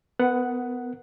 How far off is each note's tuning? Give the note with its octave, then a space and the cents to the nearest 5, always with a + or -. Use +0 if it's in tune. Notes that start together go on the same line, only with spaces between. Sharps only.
B3 +20 A#4 -5 F#5 +0